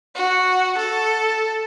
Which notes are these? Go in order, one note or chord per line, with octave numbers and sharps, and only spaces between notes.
F#4
A4